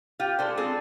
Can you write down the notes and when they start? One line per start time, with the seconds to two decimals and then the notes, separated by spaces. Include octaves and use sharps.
0.20 F4 G4
0.39 G#3 D4 A4 C5
0.57 C4 G#4 A4